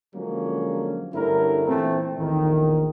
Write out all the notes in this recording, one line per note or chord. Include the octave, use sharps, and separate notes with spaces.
D3 F3 F#3 G#3 A#3 C#4
G2 D3 A3 C#4 E4 A#4
A#2 E3 A3 C4
A#1 E2 A2 D3 D#3